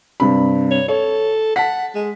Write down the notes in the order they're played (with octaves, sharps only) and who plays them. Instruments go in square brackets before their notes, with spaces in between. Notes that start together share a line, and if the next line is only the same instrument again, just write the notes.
[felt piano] G2 C3 B5
[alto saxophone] C#5
[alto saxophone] A4 [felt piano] C#5
[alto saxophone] F#5 [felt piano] A5 B6
[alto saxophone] G#3